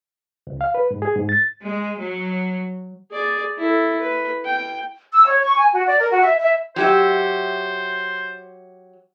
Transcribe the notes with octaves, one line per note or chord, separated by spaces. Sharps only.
C#2
F5
B4
G#2
G#4
G#2
A6
G#3
F#3
G#4 D5
E4 A4
B4
G5
E6
C#5
C#6
G#5
F#4
D5
A#4
F#4
E5
E5
F#3 G4 C5 E5